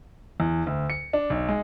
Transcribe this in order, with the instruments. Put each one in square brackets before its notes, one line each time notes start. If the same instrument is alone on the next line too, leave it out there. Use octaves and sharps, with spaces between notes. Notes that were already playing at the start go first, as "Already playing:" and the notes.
[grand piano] E2
D2
C#7
D4
B1
G#3